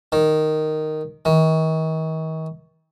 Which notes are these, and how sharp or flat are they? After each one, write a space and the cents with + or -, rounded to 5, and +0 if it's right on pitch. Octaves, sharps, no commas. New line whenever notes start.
D#3 -5
D#3 +40